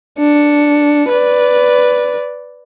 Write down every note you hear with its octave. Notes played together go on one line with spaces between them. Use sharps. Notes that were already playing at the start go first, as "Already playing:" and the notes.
D4 C#7
B4 D5